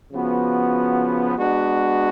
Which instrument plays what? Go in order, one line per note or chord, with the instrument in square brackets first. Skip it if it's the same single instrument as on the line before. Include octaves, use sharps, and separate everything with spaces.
[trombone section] C#3 F3 B3 F#4
G#3 B3 D4 F#4